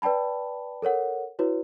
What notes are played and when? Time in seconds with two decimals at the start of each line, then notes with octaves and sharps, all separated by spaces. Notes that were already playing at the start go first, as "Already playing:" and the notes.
0.02 B4 D5 G5 A5 B5
0.82 A4 A#4 C#5 F#5
1.39 E4 F#4 B4 C#5